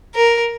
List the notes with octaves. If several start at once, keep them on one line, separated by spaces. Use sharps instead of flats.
A#4